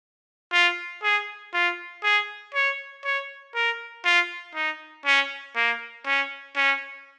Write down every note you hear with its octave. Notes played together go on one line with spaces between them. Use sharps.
F4
G#4
F4
G#4
C#5
C#5
A#4
F4
D#4
C#4
A#3
C#4
C#4